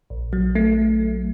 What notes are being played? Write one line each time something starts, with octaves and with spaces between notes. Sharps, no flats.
A#1
F#3
A3